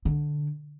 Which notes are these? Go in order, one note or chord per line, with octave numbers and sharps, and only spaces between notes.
D3